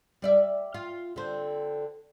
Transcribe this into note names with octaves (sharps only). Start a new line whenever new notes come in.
G3 D5 E5
F4
D3 C4